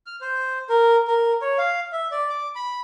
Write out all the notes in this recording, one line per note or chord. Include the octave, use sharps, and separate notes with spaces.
F6
C5
A#4
A#4
C#5
F5
E5
D5
D6
B5